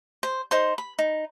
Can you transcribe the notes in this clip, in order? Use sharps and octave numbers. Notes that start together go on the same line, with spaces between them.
C5
D#4 C5 C6
B5
D#4